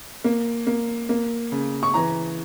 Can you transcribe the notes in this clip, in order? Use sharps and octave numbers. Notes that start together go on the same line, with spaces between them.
A#3
A#3
A#3
C#3
C#6
E3 A#5